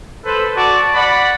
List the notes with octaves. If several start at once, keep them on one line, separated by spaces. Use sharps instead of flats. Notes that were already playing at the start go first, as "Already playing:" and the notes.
A4 B4 C5
F#4 D5 A5
D5 F#5 B5